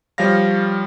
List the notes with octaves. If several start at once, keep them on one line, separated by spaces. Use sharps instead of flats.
F3 G3 C#5 F5 A#6